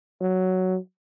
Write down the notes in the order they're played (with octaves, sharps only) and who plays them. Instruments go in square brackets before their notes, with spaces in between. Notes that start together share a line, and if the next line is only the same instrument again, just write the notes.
[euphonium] F#3